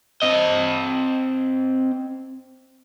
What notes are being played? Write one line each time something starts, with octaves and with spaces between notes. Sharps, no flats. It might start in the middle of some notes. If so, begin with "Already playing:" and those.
C4 D#5